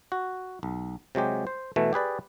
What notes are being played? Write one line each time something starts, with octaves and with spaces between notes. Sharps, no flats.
F#4
B1
C3 F#3 G#3 G4
C5
B2 E3 A3
G4 G#4 B4 D5